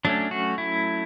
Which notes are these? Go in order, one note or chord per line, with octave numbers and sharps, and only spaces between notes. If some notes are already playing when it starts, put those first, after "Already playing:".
F#3 A3 C#4 D4
F#4
E4